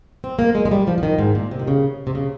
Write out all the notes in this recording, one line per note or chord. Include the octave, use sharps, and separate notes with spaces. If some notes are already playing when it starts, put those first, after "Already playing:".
C4
A#3
G#3
G#3
G3
F3
F3
D#3
G#2
A#2
C3
D#3
C#3
C3
C#3